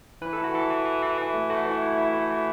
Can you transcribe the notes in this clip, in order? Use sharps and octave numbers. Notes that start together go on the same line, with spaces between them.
E3 B4
E4 A4
F#4
E3 A4
E3
E3
E3
E3
A3
A3 F#4
E3
E4
E4
A3
E3